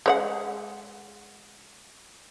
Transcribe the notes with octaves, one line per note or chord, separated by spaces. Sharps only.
G#3 C#5 F#5